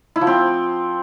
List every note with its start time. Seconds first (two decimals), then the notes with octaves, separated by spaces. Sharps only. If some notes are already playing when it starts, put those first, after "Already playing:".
0.16 E4
0.21 F3
0.27 C4